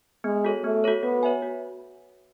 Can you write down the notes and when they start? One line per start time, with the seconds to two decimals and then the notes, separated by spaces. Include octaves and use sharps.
0.24 G#3 B3
0.45 F#4 A4 C#5
0.64 A3 B3
0.84 F#4 A4 C#5
1.03 B3 F#4
1.23 C#5 E5 G#5
1.42 F#4